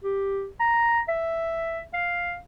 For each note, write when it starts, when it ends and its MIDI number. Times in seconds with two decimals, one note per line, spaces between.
0.04 0.48 67
0.60 1.00 82
1.09 1.80 76
1.94 2.36 77